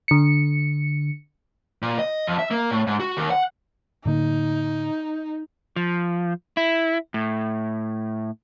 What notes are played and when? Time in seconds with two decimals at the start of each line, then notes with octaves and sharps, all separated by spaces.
0.08 D3 C#7
1.82 A#2
1.99 D#5
2.27 F2
2.39 E5
2.51 A#3
2.71 A2
2.87 G#2
3.00 F#4
3.17 D#2
3.31 F#5
4.05 A2 D3 A#3 D#4
5.76 F3
6.57 E4
7.14 A2